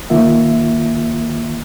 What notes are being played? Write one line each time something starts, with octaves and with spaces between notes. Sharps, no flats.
C2 D#3 A#3 F4 E5